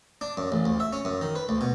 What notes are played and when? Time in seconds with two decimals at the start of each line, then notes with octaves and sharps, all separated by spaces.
0.21 D4
0.37 F#2
0.52 A1
0.65 D2
0.80 E5
0.93 C#4
1.05 F#2
1.21 D#3
1.35 B4
1.49 D2
1.61 B2